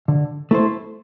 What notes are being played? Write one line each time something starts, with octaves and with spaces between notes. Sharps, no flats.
D3
A3 E4 A4 C5